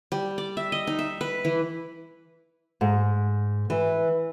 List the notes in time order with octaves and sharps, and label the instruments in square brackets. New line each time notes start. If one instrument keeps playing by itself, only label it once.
[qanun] G3
D5
E5
D#5
D#4
E5
B4
E3
[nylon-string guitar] G#2
E3